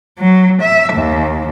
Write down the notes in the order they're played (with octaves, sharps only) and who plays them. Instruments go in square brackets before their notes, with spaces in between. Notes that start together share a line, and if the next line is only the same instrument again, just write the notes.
[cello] F#3
E5
D#2